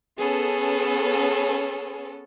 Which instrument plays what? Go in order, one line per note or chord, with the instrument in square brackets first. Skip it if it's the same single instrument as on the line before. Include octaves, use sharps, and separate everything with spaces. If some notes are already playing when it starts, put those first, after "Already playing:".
[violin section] B3 C#4 A4 [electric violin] G#4